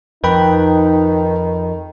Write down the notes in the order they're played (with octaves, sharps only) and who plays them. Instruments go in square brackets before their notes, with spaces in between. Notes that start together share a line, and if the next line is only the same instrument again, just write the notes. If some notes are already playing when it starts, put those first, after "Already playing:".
[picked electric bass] F2 [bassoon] D#3 [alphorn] D#4 [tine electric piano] B4 G5 B5